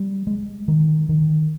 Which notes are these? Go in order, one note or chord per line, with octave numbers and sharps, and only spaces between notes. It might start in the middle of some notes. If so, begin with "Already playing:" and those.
Already playing: G3
G#3
D#3
D#3